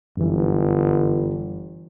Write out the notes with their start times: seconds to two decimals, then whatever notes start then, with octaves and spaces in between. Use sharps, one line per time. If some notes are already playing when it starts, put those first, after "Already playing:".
0.17 G1 F#2 E3